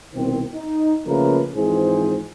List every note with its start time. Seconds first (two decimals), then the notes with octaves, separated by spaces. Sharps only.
0.15 C2 B2 D#3 C4
0.55 D#4
1.07 C#3 F3 A3 A#3 A#4 B4
1.56 G#2 E3 F3 C4 G#4 C5